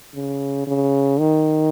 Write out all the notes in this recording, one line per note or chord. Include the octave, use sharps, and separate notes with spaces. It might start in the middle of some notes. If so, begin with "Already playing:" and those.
C#3
C#3
D#3